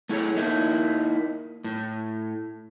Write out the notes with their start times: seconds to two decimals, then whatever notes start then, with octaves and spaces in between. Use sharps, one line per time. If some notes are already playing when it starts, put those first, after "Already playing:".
0.09 A3 E4 G#4 A4 C#5
0.37 A#3 D#4 E4
1.64 A2